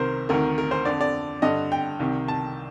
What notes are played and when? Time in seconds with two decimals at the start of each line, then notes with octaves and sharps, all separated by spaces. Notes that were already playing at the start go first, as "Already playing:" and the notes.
Already playing: C2 C3 D#3 A#4 C5
0.29 D2 C3 D#3 A#4
0.58 A#4
0.71 C5
0.85 F2 D3 D5
1.01 D5
1.42 G2 D3 D#5
1.72 G5
1.99 C2 C3 D#3
2.28 A5